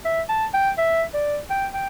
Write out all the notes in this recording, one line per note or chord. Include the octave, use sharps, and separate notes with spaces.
E5
A5
G5
E5
D5
G5
G5